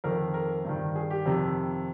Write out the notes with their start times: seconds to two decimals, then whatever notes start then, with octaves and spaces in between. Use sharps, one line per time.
0.04 F2 D#3 A#4
0.34 A#4
0.65 G2 D#3
0.95 G#4
1.10 G4
1.26 F2 C3 D#3